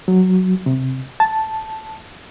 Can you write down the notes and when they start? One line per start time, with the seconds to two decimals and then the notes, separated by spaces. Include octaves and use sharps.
0.08 F#3
0.66 C3
1.20 A5